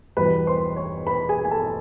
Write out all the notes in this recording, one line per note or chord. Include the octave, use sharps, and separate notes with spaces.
E2 B2 G3 B3 B4 B5
C5 C6
C#5 C#6
B4 B5
G#4 G#5
G#5
A4 A5